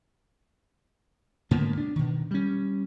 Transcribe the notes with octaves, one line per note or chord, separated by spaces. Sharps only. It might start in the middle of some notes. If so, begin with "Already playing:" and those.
G#2 D3 A#3 B3
D4
B2 D#3
G3 C#4